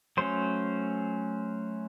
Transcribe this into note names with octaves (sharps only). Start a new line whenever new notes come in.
F#3 A3 C#4 C5